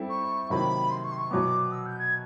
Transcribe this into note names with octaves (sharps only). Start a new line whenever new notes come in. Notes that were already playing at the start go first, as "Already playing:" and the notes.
Already playing: G3 C4 E4 A4
C#6
C3 D#3 F#3 A#3 B5
C6
C#6
C6
C#6
B2 F#3 B3 D6
E6
G6
G#6